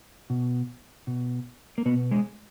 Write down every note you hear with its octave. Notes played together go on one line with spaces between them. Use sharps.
B2
B2
A#3
B2 B3
G#3